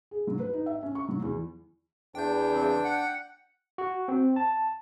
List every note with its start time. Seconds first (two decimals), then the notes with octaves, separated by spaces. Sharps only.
0.11 G#4
0.27 F#3
0.40 B4
0.53 D#4
0.66 E5
0.83 C#4
0.95 C#6
1.09 F#3
1.22 E2
2.15 E2 D4 G5 G6
2.52 C#3 E3 C4
2.84 F#5
3.78 F#4
4.08 C4
4.36 A5